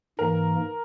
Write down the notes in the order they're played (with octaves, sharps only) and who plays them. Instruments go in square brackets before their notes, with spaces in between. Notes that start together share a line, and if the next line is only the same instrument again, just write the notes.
[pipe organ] G#2 E3 A#3 [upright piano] A#4